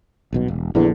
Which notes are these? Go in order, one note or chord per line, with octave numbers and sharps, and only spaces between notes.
D#1 B1 B2
E1
A#1 E2 D3